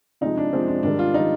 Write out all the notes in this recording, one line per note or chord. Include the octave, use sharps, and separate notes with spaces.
C3 F3 G#3 D#4
D4
C3 F3 G#3 C4
D4
G#2 D#3 G3 D4
F4
D#3 G3 D#4